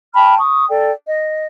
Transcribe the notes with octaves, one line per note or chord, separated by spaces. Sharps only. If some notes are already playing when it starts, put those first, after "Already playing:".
G5 A5 B5 F6
C#6 D#6
A4 D5 G5
D#5